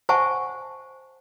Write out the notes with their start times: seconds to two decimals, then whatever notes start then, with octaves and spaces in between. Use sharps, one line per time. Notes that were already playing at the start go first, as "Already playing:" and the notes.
0.09 C5 E5 F#5 G#5 A5 C#6